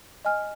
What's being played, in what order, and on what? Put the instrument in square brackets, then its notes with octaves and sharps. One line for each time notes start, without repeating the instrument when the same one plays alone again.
[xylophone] D#5 G#5 F6